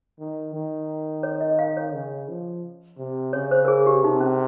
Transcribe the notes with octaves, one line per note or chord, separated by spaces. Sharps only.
D#3
D#3
C#5
D#5
F5
C#5
C#3
F3
C3
C#3 C#5
C5
A#4
G#4
G4
C3 D#4
C#4